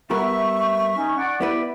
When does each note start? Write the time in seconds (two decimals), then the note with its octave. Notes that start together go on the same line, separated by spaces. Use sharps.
0.10 G3 B3 A#4 E5 C#6
0.96 C#4 D#4
1.17 D5 F#5
1.41 B3 E4 G4 B4 D5 E5